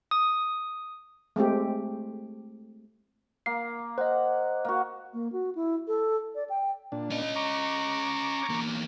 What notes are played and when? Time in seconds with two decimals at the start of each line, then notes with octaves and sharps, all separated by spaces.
0.11 D#6
1.36 G#3 A3 C4 G4
3.46 A#3 C7
3.98 C5 D#5 F#5
4.65 A#3 F#4
5.13 A#3
5.32 F#4
5.55 E4
5.88 A4
6.35 D5
6.50 G5
6.92 A#2 D4
7.11 C#4 D#5
7.36 A#5 C#6 D6
8.49 E2 A#3